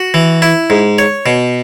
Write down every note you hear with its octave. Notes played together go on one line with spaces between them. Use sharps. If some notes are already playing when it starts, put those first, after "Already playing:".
Already playing: F#4
E3
E4
G#2
C#5
B2